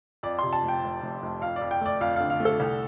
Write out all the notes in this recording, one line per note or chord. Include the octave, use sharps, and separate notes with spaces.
F2 D5
C3 C6
A5
F1
G5
F1
F1
F1
F2 F5
D5
F2
G5
A3 D5
F2 F5
D3 F5
F5
A3
A4
C2